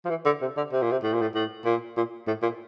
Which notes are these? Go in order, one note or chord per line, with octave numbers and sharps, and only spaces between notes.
F3
E3
D3
C3
D3
C3
A#2
C3
A2
A#2
A2
A2
A#2
A#2
A2
A#2